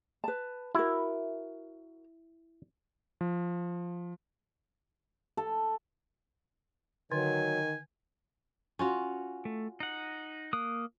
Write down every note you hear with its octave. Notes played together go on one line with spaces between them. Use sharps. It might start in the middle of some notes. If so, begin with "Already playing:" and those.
B4 A5
E4 F#4 A#4
F3
A4
D3 D#3 F#3 G#5
C#4 F4 F#4
A3
D#4 F#5
A#3 D#6 F#6